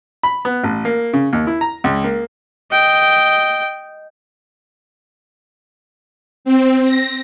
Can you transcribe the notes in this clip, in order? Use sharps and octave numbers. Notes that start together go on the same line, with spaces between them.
B5
B3
A1
A#3
C#3
D#2
E4
A#5
C#2
A#3
D#5 G5
C4
A#6